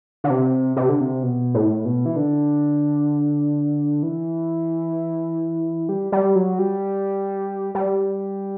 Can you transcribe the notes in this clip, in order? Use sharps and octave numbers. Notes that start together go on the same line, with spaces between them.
D3
C3
C3
D3
C3
B2
A2
B2
E3
D3
E3
G3
G3
F#3
G3
G3